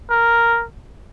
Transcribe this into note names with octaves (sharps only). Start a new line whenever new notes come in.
A#4